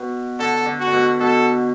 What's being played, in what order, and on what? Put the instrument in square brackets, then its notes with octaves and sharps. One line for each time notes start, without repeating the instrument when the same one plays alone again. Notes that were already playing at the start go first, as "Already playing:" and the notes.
Already playing: [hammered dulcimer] B2
[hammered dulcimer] D3 [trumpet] A4
[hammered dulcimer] D3
[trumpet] F#4
[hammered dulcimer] D3
B2
[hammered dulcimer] B2 [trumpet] A4